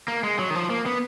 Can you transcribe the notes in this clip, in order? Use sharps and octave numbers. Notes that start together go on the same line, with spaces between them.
A#3
G#3
F#3
D#3
F3
A#3
B3